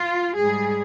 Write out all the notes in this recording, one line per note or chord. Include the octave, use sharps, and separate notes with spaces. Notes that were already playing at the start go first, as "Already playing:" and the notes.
Already playing: F4
G#2 G3 G#4